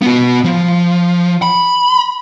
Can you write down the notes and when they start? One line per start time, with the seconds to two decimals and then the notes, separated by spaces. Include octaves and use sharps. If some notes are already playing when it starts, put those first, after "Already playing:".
0.02 B3 F#4
0.44 F3
1.42 B5